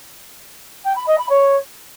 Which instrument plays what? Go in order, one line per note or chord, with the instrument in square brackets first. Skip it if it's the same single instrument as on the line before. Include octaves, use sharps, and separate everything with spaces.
[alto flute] G5
B5
D#5
B5
C#5